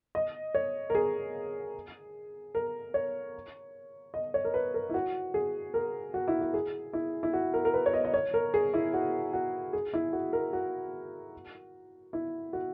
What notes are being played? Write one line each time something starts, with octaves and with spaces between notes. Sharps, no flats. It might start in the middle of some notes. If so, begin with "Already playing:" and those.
D#5
C#5
A#4
G#4
A#4
C#5
D#5
C#5
A#4
B4
A#4
E4
F#4
G#4
A#4
F#4
E4
F#4
G#4
E4
E4
F#4
A#4
A#4
B4
C#5
D#5
D#5
C#5
A#4
G#4
E4
F#4
F#4
G#4
E4
F#4
A#4
F#4
E4
F#4